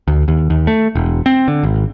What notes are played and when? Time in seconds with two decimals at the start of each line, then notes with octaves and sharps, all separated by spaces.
0.08 D2
0.28 D#2
0.50 D#2
0.67 A3
0.95 E1
1.26 C4
1.48 D3
1.63 G#1